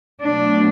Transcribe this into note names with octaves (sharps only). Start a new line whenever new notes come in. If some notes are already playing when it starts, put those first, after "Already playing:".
B2 F#3 A3 D4